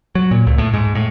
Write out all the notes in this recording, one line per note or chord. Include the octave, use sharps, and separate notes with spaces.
F#3
A#2
C#2
A2
G#2
A2